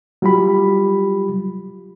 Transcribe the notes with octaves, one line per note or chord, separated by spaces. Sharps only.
F#3 G3 F4 G4 B5